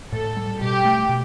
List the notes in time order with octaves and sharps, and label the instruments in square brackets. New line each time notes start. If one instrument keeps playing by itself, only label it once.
[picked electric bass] A2 [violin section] A4
[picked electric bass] G3
[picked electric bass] B2 [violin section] G4
[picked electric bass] A3
B2